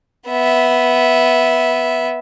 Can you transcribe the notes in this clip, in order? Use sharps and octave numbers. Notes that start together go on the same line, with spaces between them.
B3 E5